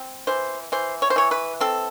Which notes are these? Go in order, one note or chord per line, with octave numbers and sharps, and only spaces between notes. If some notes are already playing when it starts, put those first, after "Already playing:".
Already playing: C4
E3 C5
E3 C5
C#5
C5
E3 C#5
B4
C4 A4